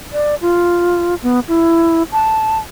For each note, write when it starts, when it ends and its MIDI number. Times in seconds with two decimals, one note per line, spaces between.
0.13 0.35 74
0.41 1.15 65
1.23 1.40 59
1.48 2.03 64
2.12 2.58 81